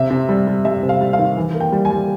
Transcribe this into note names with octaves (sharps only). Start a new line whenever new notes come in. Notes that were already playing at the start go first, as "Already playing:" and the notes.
Already playing: C3 E5
C3
G3
G3
G3 E5
C3
F5
G3
F5
D#3
E3
A#3
G5
G3
G#5
G3